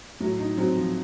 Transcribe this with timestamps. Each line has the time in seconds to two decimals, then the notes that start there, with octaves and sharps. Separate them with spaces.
0.20 A2 F#3
0.39 D#4
0.57 F#3 C4
0.76 F3